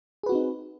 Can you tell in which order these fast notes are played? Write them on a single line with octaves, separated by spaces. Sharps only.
G#4 B4 F#4 C4 D#4